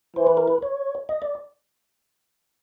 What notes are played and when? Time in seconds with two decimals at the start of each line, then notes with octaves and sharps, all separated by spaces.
0.16 E3 C5
0.27 B4
0.37 A#4
0.48 B4
0.62 C#5
1.09 D#5
1.22 D5